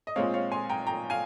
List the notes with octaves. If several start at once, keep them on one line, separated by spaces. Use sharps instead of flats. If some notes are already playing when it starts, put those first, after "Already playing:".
D#5
A#2 G#3 C4 C#5 F5
C#5 F5
G#5 C6
G5 A#5
G5 A#5
F5 G#5